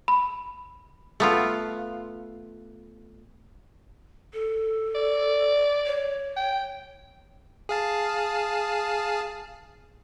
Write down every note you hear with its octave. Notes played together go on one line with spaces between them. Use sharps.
B5
A3 B3 F4
A4
D5
C#5
G5
G#4 F5 A5